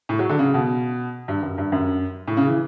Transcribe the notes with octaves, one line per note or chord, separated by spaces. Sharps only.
A2
F#3
D3
C#3
B2
G2
F#2
G2
F#2
A2
C#3
E3